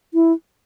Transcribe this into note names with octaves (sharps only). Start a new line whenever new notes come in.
E4